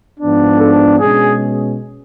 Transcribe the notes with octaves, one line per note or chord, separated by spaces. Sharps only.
G#2 F3 B3 D4
A4
B2 G#3 C#4 G#4